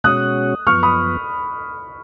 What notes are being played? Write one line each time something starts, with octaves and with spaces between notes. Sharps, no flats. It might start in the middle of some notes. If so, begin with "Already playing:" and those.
B2 G#3 C#4 F#4 C#5 D#6 F#6
F#2 F3 B3 C#6 F6
B5 D#6